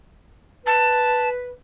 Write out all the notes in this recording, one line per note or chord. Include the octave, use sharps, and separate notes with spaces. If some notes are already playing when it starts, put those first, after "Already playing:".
B4 A5